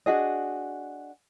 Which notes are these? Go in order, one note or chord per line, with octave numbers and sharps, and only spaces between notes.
D4 F#4 G#4 D#5